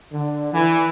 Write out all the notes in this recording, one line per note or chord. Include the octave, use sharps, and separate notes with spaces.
D3
E3